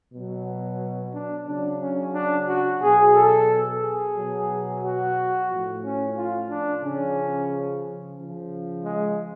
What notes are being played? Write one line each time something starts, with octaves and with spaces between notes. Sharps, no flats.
B2 F#3
D4
C#3 F#3 D4
C#4
D4
F#4
B2 F#3 G#4
A4
G#4
B2 F#3
F#4
A2 F3
C#4
F4
D4
C#3 F3 C#4
C#3 F3
G#3